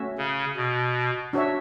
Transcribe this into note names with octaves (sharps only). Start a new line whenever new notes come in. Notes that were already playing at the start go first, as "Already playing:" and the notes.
Already playing: A3 C#4 F#4 C#5 E5
C#3
B2
D4 F#4 C#5 E5